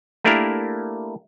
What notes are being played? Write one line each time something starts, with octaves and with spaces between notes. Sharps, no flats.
A3 A#3 D4 E4 G4 A#4